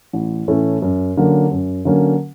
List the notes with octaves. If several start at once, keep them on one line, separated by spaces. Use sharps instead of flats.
A1
A2 E3 A3 C#4
F#2
D3 F#3 A#3 C#4
F#2
D3 F#3 A#3 C#4